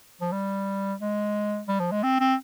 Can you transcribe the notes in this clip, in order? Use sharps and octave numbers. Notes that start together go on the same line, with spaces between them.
F3
G3
G#3
G3
F3
G#3
C4
C4